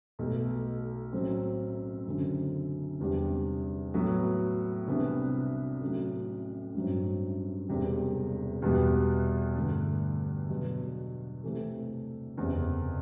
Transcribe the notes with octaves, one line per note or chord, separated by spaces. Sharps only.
B1 B2 A3
A1 A2 F#3 C4
F#1 F#2 D3 F#3 C4
E2 C3 G3 D4
A2 F#3 B3 F#4 B4
C2 C3 E3 B3 D4
A1 A2 F#3
A1 G2 F#3 C4
E1 E2 C3 G3
E2 B2 G3 B3
G2 D3 A3
B2 F#3 B3 F#4
C3 E3 A3
F#1 E2 C3